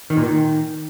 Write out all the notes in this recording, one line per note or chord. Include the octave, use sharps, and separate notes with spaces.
D#3
A#2
D#3